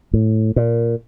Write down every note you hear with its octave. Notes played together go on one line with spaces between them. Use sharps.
A2
A#2